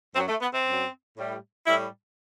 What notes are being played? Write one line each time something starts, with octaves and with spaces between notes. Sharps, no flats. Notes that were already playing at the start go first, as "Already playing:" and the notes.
F#2 F#3 C4
A3
B3
C4
F#2 F#3
A2 G3
A2 G3 E4